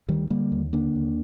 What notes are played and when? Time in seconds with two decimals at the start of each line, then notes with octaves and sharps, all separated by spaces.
0.09 D2 D#3 G3
0.30 D3 G3 A#3
0.52 D#2
0.73 D3 A#3 D4
0.95 D#2